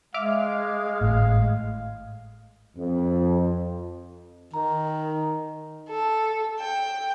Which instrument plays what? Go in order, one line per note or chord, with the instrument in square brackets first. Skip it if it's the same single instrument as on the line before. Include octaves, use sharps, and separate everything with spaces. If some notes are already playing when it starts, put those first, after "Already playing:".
[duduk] G#3 [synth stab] E5 D6 F6 [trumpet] F5
[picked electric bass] G#1 A2 [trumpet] F5
[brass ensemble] F2
[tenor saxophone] D#3 [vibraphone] A#5
[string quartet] A4
G5